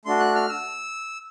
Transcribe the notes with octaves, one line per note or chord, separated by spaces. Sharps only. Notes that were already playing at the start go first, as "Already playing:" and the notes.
A3 D4 F#4 C6
F#6
F6
E6